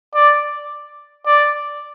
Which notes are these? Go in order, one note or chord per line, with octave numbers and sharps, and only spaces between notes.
D5
D5